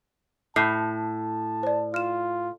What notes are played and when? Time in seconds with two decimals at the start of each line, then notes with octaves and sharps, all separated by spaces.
0.56 A2 A5 D6 G6 C7
1.63 C5 D5
1.94 F4 F6 E7